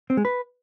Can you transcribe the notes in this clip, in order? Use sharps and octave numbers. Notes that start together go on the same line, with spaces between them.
C4
G#3
B4